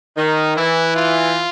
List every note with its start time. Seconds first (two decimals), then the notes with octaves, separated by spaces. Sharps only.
0.17 D#3 D#4
0.56 E3 E4
0.96 F4